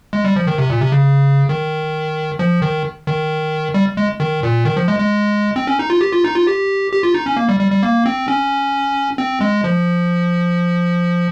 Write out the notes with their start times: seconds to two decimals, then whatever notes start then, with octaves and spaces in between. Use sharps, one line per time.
0.13 G#3
0.25 G3
0.36 F3
0.47 D#3
0.58 C3
0.70 A#2
0.81 C3
0.92 C#3
1.49 D#3
2.39 F3
2.62 D#3
3.07 D#3
3.74 G3
3.97 G#3
4.20 D#3
4.43 A#2
4.65 D#3
4.77 F3
4.88 G#3
4.99 G#3
5.56 C4
5.67 C#4
5.79 D#4
5.90 F4
6.01 G4
6.13 F4
6.24 D#4
6.35 F4
6.47 G4
6.92 G4
7.03 F4
7.14 D#4
7.26 C#4
7.37 A#3
7.49 G3
7.60 G3
7.72 G3
7.83 A#3
8.06 C4
8.28 C#4
9.18 C4
9.41 G#3
9.64 F3